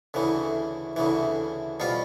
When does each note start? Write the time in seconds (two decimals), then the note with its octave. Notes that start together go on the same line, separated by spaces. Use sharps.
0.14 D2 C#3 E3
0.96 D2 C#3 E3
1.80 B2 G3 C4 F4